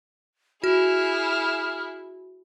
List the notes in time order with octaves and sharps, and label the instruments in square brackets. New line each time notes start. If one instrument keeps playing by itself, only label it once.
[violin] E4 G#4 [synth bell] F#4 [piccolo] F6